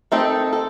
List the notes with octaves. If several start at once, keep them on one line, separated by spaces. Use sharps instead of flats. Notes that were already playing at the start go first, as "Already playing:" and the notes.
D#3 A3 C4 D#4 A4
A4